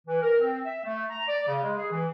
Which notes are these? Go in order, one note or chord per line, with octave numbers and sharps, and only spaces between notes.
E3
A#4
C4
E5
A3
A#5
D5
C#3
G#3
G#4
E3